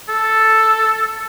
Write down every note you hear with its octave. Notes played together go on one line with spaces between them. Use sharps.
A4